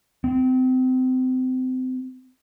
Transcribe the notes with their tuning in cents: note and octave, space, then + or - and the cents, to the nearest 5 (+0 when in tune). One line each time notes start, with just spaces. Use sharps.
C4 -30